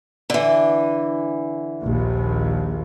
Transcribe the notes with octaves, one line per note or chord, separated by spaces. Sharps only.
D3 E3
A#1 D#2